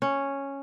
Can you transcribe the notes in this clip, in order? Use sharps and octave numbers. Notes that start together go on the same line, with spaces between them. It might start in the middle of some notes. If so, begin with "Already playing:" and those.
C#4